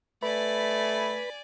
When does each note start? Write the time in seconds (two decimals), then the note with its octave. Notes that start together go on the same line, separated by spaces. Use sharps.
0.22 A3 B4 D5 G#5 B5